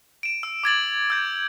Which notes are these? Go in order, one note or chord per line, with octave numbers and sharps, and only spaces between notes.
D7 E7
E6
D6 G#6 A6 F#7
E6 G6 A6